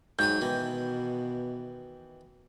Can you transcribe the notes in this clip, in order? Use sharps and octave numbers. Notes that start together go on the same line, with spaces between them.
G#2 F#3 G5 D#6 G6
B2 D#3 E3